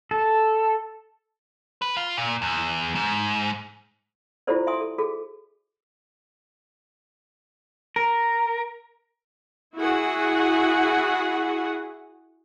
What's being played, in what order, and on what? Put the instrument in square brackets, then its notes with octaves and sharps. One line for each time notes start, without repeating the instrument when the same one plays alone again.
[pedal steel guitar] A4
[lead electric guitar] B4
F4
A#2
E2
G#2
[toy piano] E4 F4 G4 A4 C5 D5
E5 G#5 C6 D#6
A4
F#4 G#4 A4
[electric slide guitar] A#4
[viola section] E4 F#4 G#4 F#5